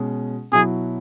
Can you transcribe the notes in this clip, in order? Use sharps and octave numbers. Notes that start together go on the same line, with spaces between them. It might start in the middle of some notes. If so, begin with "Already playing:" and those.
Already playing: B2 G#3 C#4
B2 F#3 E4 G#4